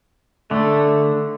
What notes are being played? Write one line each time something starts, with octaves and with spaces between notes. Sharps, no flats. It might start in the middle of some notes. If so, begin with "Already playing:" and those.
D3 A3